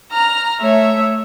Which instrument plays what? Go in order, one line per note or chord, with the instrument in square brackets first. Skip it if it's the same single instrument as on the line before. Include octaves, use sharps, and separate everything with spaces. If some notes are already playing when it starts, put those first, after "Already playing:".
[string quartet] A#5 F6
A3 C#5 E5